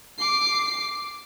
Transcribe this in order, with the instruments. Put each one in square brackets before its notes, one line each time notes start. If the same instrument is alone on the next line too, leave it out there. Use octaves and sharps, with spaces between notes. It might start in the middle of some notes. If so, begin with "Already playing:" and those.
[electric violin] D6 C7